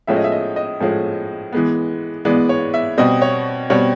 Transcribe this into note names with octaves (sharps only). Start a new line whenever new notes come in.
A2 F3 G#3 C#4 E5
D#5
E5
D#5
D#5
A2 F3 G#3 C#4
E3 G#3 B3
E3 G#3 B3 D5
C#5
E5
B2 G3 C4 D#5
C#5
B2 G3 C4 C#5